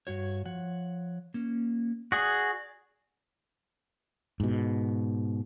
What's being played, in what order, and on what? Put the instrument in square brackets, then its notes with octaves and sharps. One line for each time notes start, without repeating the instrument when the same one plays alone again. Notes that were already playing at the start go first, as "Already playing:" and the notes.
[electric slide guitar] G2 F#4 C#5
F3 C#5 F#5
A#3 C#4
[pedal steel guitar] F#4 G#4 [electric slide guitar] D5
[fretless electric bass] G#2 B2